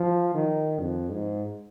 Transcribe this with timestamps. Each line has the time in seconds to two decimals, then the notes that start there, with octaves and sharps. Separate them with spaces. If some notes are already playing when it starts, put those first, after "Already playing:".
Already playing: F3
0.35 D#3
0.80 F2
1.11 G#2